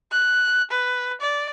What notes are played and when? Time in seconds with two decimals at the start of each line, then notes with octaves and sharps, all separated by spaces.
0.12 F#6
0.71 B4
1.21 D5